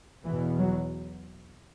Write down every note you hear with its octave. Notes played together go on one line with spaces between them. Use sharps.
E2 B2 E3
F#3